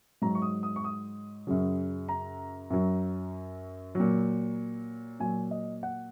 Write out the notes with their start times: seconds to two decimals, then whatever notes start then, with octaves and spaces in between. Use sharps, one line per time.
0.22 G#2 F#3 A#5
0.35 C#6
0.42 D#6
0.63 D#6
0.76 C#6
0.84 D#6
1.47 F#2 C#3 F#3
2.09 A#5
2.70 F#2 F#3
3.95 A#2 F#3
5.20 A#2 F#3 G#5
5.51 D#5
5.83 F#5